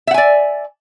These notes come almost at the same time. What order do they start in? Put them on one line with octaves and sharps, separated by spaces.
E5 F#5 G#5 D5